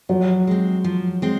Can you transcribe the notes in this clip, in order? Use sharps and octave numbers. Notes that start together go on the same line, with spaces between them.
F3 F#3
G#3 C4
F3
G#3 C4